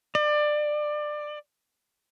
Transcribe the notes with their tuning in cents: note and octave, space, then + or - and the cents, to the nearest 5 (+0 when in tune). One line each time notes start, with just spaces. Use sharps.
D5 +25